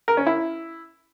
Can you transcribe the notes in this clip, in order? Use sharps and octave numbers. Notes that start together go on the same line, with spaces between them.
A#4
C#4
E4